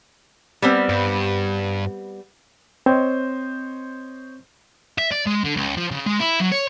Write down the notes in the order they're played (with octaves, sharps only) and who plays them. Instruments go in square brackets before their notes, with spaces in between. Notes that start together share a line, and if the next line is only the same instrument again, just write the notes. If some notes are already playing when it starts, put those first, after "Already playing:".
[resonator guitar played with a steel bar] G3 B3 C4
[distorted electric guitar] G2
[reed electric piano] C4 [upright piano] C5 C#5 D#5
[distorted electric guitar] E5
D5
G#3
D3
C#2
F3
C#3
G#3
E4
F#3
C#5